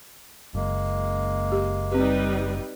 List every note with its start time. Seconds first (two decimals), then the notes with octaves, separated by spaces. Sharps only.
0.54 F#1 G#3 A#3
1.52 G4
1.92 G3 C4 D#4 G4 B4